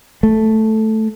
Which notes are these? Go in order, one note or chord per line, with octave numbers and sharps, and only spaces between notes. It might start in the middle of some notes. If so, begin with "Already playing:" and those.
A3